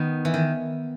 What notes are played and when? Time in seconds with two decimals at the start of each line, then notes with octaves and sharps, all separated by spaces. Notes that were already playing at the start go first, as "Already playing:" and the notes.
Already playing: D#3 B3
0.25 E3
0.34 D#3